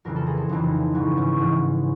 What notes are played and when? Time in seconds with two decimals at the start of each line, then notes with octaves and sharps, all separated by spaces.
0.05 F2 C#3 E3 A#4
0.16 A4
0.27 G#4
0.37 A4
0.49 F2 C#3 E3 D#4
0.94 G#2 E3 C#4
1.17 C#4
1.40 G#2 E3